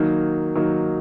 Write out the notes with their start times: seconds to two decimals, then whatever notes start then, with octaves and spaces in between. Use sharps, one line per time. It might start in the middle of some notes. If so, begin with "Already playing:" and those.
Already playing: D#3 F#3 A#3 D#4
0.55 D#3 F#3 A#3 D#4